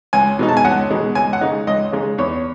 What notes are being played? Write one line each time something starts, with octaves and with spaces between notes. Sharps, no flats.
C#2 G#5
B2 G#3 D#4
A5
G#5
C#2 F#5
B2 G#3 D#4
C#2 G#5
F#5
C#3 G#3 D#4
C#2 D#5
C#3 G#3 D#4
E2 C#5